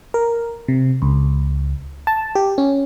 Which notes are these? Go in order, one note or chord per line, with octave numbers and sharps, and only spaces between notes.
A#4
C3
C#2
A5
G4
C#4